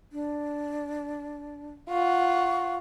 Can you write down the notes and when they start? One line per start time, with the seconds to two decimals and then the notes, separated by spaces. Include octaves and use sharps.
0.12 D4
1.90 F4 F#5 C#6